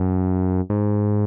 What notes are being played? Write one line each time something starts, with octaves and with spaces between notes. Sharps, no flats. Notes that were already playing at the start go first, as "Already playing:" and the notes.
Already playing: F#2
G#2